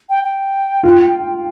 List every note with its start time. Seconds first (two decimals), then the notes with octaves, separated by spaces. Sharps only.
0.09 G5
0.23 G5
0.83 F4